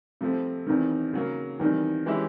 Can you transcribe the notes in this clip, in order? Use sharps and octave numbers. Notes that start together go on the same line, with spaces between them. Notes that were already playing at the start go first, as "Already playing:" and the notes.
C3 F3 A3 C4
E2 C3 D#3
C#3 F#3 A#3
E2 C3 D#3 G3
E3 G#3 C#4 E4 G4